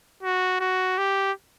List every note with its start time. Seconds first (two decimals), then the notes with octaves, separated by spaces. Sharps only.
0.23 F#4
0.60 F#4
0.98 G4